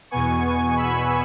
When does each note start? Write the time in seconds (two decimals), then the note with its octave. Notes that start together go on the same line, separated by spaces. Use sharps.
0.11 E2 B2 B3 G#5 C#6
0.45 G#5 C#6
0.77 B5 E6